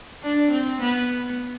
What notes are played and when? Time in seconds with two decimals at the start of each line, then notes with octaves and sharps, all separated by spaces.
0.23 D4
0.51 C4
0.81 B3